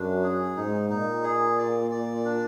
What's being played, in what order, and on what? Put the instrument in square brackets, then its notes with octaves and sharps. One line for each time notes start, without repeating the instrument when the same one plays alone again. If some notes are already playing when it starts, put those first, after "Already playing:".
Already playing: [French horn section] F#2 [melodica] D4
[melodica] G#4
[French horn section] G#2 [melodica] D#4
[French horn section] A#2 [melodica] D#4
[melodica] G#4
D5
D5
D4